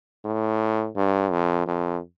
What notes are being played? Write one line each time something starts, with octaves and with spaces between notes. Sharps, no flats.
A2
G2
F2
F2